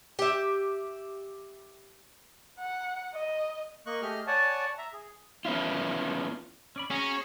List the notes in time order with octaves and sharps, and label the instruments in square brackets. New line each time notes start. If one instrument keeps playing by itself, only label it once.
[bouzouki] G4 E5
[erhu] F#5
D#5
[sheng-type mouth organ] A#3 D#5 C#6 F#6
A3 G4 G#4 D#5 F6
C#5 D5 F#5 G#5 A5
E5 A#5
G#4
[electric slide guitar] B3 C#4 E4 F4
[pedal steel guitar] C#4 D5 B5
[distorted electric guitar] C#4 [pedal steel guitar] F#4 F#5 A#5 [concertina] G#4 C#5